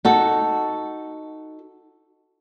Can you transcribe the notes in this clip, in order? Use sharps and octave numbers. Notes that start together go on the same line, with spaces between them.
D#4 F#4 A4